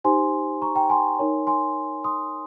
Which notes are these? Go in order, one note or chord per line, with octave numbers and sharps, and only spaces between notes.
D#4 G4 C5 G#5 C6
A#5 C#6
G5 A#5
G#5 C6
D#4 A#4 C#5
G#5 C6
C6 D#6